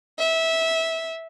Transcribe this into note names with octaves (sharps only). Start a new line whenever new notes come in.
E5